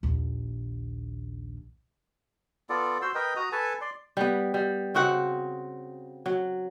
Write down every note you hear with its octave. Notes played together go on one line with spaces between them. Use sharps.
A#1 D#2
B3 F4 A4 D5
F#4 C5 C6 E6
A#4 B4 D#5 G5
F#4 A#5 D#6
A4 B4 G#5 A5
D5 C6
G3 B3
G3
C#3 C4 F#4 F#5
F#3